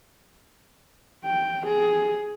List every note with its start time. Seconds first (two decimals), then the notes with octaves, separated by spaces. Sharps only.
1.24 G5
1.67 G#4